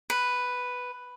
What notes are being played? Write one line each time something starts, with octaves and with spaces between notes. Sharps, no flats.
B4